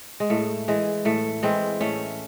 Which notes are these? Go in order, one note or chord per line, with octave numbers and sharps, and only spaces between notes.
G#3
A2 A3
E3 G#3
A2 A3
E3 G#3 C4
A2 A3 C#4